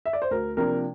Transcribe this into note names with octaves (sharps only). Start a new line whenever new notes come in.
E5
D5
C5
D2 A#4
C3 F3 A#3 D4 A#4